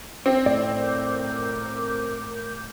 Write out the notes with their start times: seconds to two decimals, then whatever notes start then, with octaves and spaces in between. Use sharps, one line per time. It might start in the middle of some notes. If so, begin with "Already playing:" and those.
0.26 C4
0.46 A2 D5
0.78 A#4 D6 G6